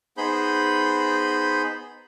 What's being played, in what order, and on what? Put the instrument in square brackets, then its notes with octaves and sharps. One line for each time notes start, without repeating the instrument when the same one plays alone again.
[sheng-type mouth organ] B3 D#4 G#4 C5 B5 G6